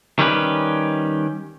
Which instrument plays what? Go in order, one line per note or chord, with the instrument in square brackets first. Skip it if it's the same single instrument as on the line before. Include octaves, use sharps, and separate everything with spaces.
[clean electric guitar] D#3 G3 C#4 G4 B4